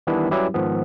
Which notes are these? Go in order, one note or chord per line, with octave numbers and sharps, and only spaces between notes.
D#3 E3 G3 B3 D4 E4
F#3 G3 C#4 E4 G4 B4
G#2 D#3 F3 B3